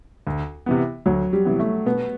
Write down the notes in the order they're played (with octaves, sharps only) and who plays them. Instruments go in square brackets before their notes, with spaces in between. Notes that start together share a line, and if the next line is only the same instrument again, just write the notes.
[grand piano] D2
C3 E3 B3
[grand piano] D2 [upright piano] F#3
[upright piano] G3
[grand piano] C3 E3 B3
[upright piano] A3
[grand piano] B2 [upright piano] B3